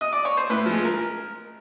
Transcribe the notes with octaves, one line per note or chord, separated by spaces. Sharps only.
D#5
D5
C#5
C5
A2 B4
F3 G#3
A#4